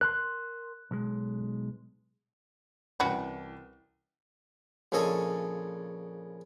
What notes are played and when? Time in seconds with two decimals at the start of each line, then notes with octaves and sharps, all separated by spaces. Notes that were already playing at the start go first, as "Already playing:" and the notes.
0.01 A#4 A#5 C6 F#6
0.91 B1 G#3
3.00 C2 E3 C#4 F#4 B4 G5
4.92 A#1 C#3 C#4 A4 D#5 G#5